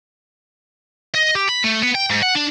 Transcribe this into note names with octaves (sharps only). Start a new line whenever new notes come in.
D#5
G4
B5
A3
B3
G5
G#2
F#5
D4